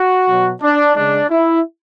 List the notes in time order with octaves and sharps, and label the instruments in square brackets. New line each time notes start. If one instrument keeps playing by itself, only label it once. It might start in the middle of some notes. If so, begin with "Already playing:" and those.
Already playing: [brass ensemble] F#4
B2 F#3
D4
C#3 G#3 D4
E4